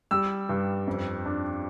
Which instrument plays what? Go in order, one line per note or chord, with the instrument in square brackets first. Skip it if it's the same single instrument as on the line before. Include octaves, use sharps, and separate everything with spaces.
[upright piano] G3 E6
G2
F2
D4